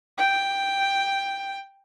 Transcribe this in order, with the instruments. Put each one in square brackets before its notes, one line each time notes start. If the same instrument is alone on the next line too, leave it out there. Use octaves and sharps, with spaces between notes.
[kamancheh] G5